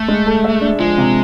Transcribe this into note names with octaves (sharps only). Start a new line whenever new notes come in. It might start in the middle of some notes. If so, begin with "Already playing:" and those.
Already playing: A3
G#3
A4
E5
D4
F3 G#3
C3